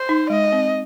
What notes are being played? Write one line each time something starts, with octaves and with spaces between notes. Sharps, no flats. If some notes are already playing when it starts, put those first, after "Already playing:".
Already playing: C5
D#4
G#3 D#5
C4